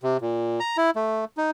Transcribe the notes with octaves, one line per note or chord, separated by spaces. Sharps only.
C3
A#2
A#5
E4
A3
D#4